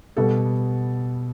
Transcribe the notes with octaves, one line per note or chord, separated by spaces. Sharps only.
B2 G3 B3 A4